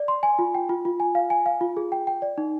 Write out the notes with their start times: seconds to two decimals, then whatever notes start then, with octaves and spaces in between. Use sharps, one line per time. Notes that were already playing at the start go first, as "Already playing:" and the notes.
Already playing: D5
0.08 C6
0.23 G#5
0.39 F4
0.55 G5
0.69 F4
0.85 F4
1.00 G#5
1.15 F5
1.30 G#5
1.46 F5
1.61 F4
1.77 G#4
1.92 G5
2.07 G5
2.22 D5
2.38 D#4